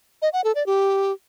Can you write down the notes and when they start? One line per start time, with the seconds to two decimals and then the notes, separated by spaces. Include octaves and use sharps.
0.22 D#5
0.33 F#5
0.44 A4
0.55 D5
0.66 G4